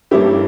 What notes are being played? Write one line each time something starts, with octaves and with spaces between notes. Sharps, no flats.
G2 G3 A#3 C#4 E4 G4